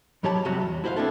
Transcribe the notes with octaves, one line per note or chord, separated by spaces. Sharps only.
G#2 F#3 G4 C#5 A5 B5
C2 F2 C3 F#3 G3 F#4
E2
E4 F#4 C5 E5 F5
B3 C4 D4 E4 A4